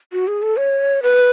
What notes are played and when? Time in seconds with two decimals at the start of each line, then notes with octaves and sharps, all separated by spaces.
0.13 F#4
0.27 G#4
0.42 A4
0.57 C#5
1.03 B4